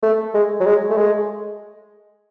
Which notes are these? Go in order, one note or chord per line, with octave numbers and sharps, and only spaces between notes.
A3
G#3
F#3
G#3
A3
G#3